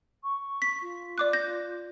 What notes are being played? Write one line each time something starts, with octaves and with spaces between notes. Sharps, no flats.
C#6
B6
F4
D5 D6 F#6
G6 A#6